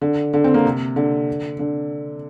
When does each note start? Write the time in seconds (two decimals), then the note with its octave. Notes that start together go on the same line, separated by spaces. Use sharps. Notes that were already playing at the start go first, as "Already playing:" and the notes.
0.01 D3
0.34 D3
0.44 C4
0.54 A#3
0.65 C3
0.96 D3
1.59 D3